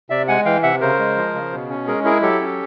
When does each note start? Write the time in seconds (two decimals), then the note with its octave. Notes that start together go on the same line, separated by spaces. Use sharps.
0.10 C3 D5 E5
0.28 G#3 F#5 G#5
0.45 E3 F5 G5
0.63 C3 E5 F#5
0.81 C#3 A#4 C5
0.99 G#3
1.17 F3
1.35 C#3
1.52 B2
1.70 C#4
1.87 G#3 G#4 A#4
2.04 E4 G#4 A#4
2.22 F#3 G4 A4
2.41 C#4